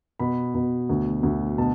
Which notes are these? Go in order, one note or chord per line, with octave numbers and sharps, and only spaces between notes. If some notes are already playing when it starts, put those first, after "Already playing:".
B2 B5
B2
D2
D2
B2 A5